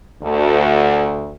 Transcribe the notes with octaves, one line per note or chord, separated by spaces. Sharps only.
D2